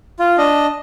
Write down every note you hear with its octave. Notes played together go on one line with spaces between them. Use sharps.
F4
D4 D#5